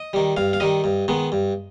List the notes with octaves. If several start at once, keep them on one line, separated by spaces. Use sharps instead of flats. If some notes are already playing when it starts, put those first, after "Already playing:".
Already playing: D#5
D#3 G3
G2 F5
F5
D#3 G3 D#5
G2
D#3 G#3 B3
G2